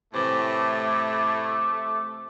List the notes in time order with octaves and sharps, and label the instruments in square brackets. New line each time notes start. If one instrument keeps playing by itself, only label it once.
[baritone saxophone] A2 [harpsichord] C3 E3 [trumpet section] A3 [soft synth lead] D6